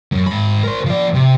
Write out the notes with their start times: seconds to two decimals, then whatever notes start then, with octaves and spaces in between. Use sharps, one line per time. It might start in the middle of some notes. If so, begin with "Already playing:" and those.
0.12 F#2
0.27 G#2 B5
0.63 A#4 C5
0.86 F3 D5
1.14 C3